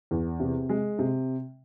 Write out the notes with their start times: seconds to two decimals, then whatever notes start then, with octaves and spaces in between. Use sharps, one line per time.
0.11 E2
0.40 C3
0.69 G#3
0.99 C3